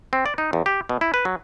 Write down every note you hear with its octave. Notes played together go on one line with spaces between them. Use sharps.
C4
D5
D#4
E2
G4
B2
E4
B4
F#3